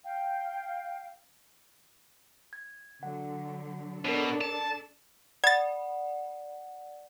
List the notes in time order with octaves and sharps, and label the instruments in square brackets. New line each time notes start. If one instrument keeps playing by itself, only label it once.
[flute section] F5 G5
[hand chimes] G#6
[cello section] D3 F#3 [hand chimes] F#5
[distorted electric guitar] B2 [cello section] D4 A4 D5 [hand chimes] A#4 C#5
[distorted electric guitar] A5
[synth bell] D5 F#5 [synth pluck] G#6 A6